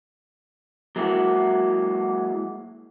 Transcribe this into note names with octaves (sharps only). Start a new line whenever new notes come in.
F#3 G#3 A#3 E4 F#4